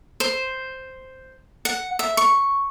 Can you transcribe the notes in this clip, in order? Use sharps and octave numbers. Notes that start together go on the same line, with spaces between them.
C5
F#5
E5
C#6